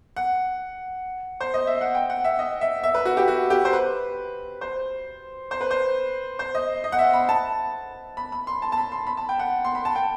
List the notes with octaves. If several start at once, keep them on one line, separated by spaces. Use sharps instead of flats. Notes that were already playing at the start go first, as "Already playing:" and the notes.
F#5
C5
D#5
E5
F#5
G5
F#5
E5
D#5
E5
E5
B4
F#4
G4
F#4
G4
C5
B4
C5
C5
B4
C5
C5
D#5
D#5
F#5
E5
B5
A5
B5
B5
C6
A5
A5
B5
C6
B5
A5
G5
F#5
C6
B5
A5
G5